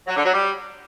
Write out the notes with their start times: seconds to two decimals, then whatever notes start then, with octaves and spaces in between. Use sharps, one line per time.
0.08 F#3
0.16 D3
0.25 F#3
0.33 G3